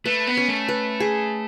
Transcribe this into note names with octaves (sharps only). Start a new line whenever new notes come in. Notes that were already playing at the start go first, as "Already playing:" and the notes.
A3 B4
B3
C#4
A3
B4
G#4